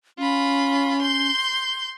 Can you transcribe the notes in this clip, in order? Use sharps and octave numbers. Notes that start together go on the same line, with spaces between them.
C#4 F4 B5
C6 G6